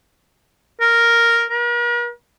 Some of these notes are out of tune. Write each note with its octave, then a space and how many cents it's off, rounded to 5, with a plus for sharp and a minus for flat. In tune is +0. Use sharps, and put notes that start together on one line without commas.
A#4 +0
A#4 +45